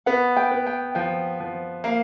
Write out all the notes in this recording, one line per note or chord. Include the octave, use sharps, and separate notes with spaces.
B3 F#5
G5
B3
G5
F3 G5
F3
A#3 F5